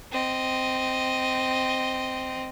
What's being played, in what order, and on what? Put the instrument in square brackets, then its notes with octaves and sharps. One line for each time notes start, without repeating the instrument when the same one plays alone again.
[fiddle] C4 D#5